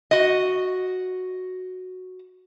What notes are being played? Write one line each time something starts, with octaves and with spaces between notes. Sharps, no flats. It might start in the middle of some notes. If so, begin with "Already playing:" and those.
F#4 D#5